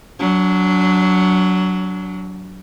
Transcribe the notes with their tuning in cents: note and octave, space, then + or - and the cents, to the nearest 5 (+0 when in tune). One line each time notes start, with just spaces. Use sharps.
F#3 +5 D4 -30